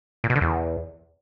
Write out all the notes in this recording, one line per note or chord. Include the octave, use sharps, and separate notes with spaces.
A#2
B2
D3
E2